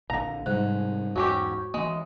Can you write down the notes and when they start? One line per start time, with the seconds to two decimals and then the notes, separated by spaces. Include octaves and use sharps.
0.10 A#1 A#2 D3 F5 A#5
0.46 G#2 C3 G3 G#3 F#6
1.16 E2 F#3 C#4 F#4 G4 C#6
1.74 E3 G#3 A#3